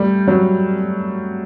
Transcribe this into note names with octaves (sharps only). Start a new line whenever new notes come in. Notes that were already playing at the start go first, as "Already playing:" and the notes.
Already playing: G3 A3
F#3